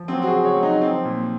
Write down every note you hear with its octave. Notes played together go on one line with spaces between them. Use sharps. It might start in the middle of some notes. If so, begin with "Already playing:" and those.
Already playing: F3
F#3 C4
F#4
G#4
C#3
C#5
F#3
D#4
F3 C4
A#2